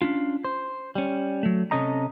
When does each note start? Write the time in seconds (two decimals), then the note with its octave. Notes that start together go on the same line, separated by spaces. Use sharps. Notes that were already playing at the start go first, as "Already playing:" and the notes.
0.02 C#4 D4 F4
0.45 C5
0.95 G3 C#4
1.43 F#3 A3
1.71 C3 C#4 A4 D#5 A#5